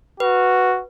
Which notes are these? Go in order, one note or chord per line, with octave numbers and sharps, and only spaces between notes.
F#4 B4